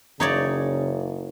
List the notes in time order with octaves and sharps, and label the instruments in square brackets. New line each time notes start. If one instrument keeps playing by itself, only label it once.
[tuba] F#1 [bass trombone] C#3 [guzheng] D#4 C#5 D5